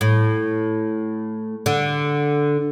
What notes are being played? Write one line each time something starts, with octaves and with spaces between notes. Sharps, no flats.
A2
D3